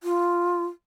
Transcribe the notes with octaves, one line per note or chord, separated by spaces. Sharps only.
F4